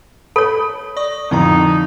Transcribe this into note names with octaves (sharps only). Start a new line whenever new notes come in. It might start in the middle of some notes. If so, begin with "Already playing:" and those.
A4 C#5 B5
D5 C#6 D#6
F2 D3 C4 D#4 E4 A#5